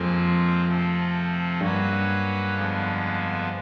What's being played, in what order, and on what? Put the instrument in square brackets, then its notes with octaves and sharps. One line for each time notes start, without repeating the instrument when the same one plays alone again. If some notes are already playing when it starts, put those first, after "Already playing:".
Already playing: [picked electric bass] F2 [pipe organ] A#2 F3 G#3 C4 F4
[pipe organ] C3 F3 A3 C4
[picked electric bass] G2 [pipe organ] F#3 A#3 C#4 F#4 B4
[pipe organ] F2 D3 F3 G#3 B3